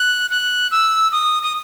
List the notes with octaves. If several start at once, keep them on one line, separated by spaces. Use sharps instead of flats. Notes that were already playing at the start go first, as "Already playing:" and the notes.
Already playing: F#6
F#6
E6
D#6
D#6